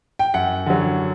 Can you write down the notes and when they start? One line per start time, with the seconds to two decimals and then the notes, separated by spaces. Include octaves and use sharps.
0.19 G5
0.34 F#2 F#5
0.66 D3 F#3